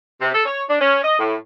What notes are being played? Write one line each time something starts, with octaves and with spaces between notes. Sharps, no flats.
C3
A4
C#5
D4
C#4
D#5
A2